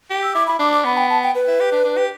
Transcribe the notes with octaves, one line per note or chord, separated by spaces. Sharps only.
G4
E6
E4 D6
E4 B5
D4 D6
D6
B3 B5
G5
A5
G5
B4
E4
G4
D4
D4
G4